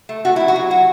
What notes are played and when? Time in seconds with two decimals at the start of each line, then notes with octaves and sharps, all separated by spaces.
0.09 A3
0.25 A3 F#4
0.36 F#3 E4
0.48 F#4
0.56 F#3
0.70 F#3 F#4